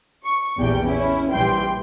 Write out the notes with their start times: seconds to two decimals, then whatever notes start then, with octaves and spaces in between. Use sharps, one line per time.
0.23 C#6
0.57 A#1 E2 G3 G5
0.88 C#4 E4
1.32 A#1 E3 G3 G5 C6